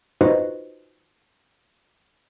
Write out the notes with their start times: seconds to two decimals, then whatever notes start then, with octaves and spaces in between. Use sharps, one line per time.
0.21 D#4 F4 F#4 B4 C5 D#5